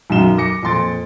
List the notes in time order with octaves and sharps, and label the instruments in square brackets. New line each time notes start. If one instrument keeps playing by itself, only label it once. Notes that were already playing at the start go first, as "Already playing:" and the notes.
[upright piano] B1 F#2 F#3 E7 G7
D6 A#6 C#7
F2 A#2 C6 A6 D7